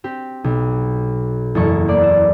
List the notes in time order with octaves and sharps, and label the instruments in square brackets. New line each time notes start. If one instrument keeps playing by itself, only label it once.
[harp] C4 G4
B1
F#1 E2 E4 A4 A#5 C#6
A#3 D5
E7